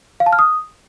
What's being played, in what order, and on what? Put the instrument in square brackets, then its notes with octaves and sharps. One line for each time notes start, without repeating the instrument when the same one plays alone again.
[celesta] F5
A5
F6
D#6